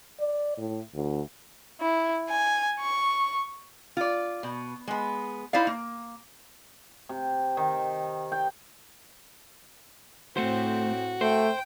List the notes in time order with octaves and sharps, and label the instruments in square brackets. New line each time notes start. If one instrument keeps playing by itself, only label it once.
[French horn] D5
A2
D2
[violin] E4
G#5
C#6
[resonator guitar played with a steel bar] F4 D5
B2
G#3 B3
D#4 E4 C5 D5 F5
A#3
[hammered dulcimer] C3
D#3
G5
[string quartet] A2 C4 [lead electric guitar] A3 C5 [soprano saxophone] F#4
[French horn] A3 [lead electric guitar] C5 [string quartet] G5